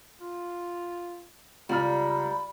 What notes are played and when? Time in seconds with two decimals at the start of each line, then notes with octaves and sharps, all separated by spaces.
0.21 F4
1.69 C#2 G3 A#5 B5 F6